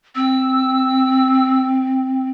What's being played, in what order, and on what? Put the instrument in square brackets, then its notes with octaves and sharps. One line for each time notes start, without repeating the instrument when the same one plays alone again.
[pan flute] C4 [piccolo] E6